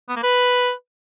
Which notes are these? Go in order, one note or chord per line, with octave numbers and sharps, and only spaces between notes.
B3
A#3
B4